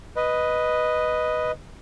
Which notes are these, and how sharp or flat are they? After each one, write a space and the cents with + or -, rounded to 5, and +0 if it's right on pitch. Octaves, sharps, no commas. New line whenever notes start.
B4 +0 D#5 +0